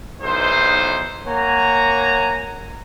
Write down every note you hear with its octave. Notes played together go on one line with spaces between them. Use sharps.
B1 E2 D#4 C5
A#3 C#5 F#5 G#5 A#5